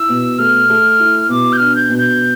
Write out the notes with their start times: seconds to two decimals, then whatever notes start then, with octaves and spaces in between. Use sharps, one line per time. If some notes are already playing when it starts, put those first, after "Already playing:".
Already playing: E4 E6
0.09 B2
0.38 A3 F6
0.70 A3
1.00 E4
1.29 B2 D6
1.52 G6
1.57 D4 F6
1.75 G6
1.90 B2
1.98 G6